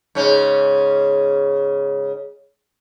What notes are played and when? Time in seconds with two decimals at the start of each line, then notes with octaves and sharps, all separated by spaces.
0.15 G#2 C#3 C#4